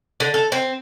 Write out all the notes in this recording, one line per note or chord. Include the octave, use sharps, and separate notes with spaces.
D3
A4
C4